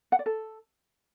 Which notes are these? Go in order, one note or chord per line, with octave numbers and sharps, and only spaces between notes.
F#5
D5
A4